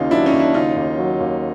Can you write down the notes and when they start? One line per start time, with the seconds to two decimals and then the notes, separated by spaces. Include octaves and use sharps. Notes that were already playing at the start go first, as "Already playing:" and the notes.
Already playing: D#2 C#3 D#4 F4
0.11 F#3 D4 E4
0.26 C#4 D#4
0.33 D#2
0.40 D4 E4
0.54 C#3 D#4 F4
0.76 D#2
0.98 F#3
1.20 D#2